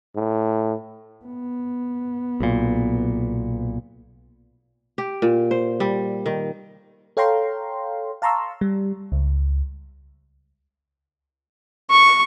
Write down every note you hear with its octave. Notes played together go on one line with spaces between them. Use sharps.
A2
B3
B1 A#2
G4
A#2
C5
G3
D#3
A4 C#5 F5 G5 A#5 C6
F5 A5 A#5 C6 C#6 E6
G3
C#2
C#6